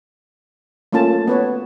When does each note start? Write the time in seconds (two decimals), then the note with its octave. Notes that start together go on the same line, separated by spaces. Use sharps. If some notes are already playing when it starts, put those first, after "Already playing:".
0.92 A3 A#3 C#4 F4 A5
1.27 B3 B4 C#5